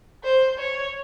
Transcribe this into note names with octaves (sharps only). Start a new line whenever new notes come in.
C5
C#5